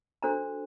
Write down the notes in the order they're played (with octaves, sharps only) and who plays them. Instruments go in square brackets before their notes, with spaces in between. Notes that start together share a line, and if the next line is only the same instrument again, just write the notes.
[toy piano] D4 F#4 A4 C5 A#5